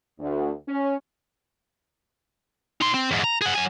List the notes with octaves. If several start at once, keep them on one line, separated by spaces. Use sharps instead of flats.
D2
C#4
D#4 C6
C4
E2 G#2
A#5
G#4 F#5
F#3 G#5